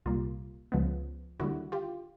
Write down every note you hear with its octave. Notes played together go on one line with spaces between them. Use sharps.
C2 A#2 G3 A#3 F4
C#2 C#3 F3 G#3 B3
D#2 D3 G3 E4 F#4
F4 G4